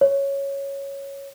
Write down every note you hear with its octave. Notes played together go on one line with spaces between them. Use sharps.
C#5